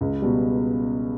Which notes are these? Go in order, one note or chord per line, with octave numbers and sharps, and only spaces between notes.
C#2
B2 G3